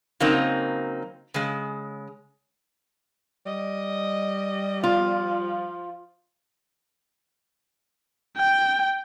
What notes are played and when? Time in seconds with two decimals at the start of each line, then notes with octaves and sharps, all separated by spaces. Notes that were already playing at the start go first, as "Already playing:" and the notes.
0.20 C#3 F#3 A#3 C4 D#4
1.34 C#3 G#3
3.46 G3 D#5
4.84 F3 F4
8.37 G5